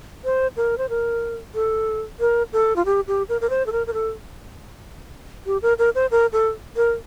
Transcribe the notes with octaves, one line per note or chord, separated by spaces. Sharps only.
C5
A#4
C5
A#4
A4
A#4
A4
F4
G4
G4
A#4
A#4
C5
A4
A#4
A#4
A4
G4
A#4
A#4
C5
A#4
A4
A#4